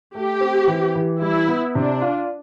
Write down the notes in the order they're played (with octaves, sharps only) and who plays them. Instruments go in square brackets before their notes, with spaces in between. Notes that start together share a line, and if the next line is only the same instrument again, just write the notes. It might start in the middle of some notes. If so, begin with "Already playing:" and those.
[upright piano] A3 [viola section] G4
[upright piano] C4
E3
E3
[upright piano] G3 [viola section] E4
[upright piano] B3
[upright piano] C3 [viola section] D4
[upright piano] F4